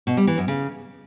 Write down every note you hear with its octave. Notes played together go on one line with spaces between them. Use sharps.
B2
G3
E3
F#2
C#3